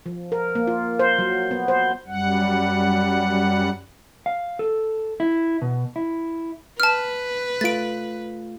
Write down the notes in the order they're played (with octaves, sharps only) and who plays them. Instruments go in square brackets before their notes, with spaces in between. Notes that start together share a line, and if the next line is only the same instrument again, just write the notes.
[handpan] F3
A#4
A#3
F4
C5
F#3
B3
C5
[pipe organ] F#2 G3 F#5
[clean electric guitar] F5
A4
E4
B2
E4
[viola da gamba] B4 [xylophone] A5 F6
[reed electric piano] A3 F4 [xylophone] A6 D7